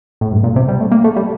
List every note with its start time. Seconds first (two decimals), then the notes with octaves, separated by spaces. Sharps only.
0.21 A2
0.32 G2
0.43 A#2
0.56 C3
0.69 G3
0.81 A3
0.92 A#3
1.04 A3
1.16 G3